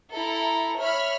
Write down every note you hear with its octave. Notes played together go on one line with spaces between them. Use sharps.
E4 A4 A#5
C#5 E5 B5 F6